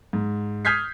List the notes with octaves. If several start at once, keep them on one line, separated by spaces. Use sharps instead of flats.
G#2
D#6 F6 G6 G#6 B6 C7